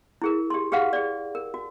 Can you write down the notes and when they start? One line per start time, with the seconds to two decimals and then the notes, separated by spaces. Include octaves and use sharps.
0.22 E4 G#4 A#4
0.50 G4 C6
0.72 G4 G#4 B4 F5 F#5
0.93 G#4 D5
1.35 A#4
1.54 F#4